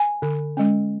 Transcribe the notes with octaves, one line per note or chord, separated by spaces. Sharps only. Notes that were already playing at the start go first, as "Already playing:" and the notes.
Already playing: G#5
D3
G#3 C#4